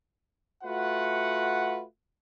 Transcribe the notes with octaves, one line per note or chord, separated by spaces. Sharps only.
A3 F4 F#4 B4 F#5